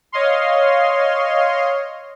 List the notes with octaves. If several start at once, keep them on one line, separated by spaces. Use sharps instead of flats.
C#5 D#5 F5 C6